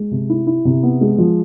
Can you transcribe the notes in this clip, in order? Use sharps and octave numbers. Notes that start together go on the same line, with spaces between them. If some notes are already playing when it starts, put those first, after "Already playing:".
Already playing: G#3
C3
E4
E4
C3
B3
G#3
F3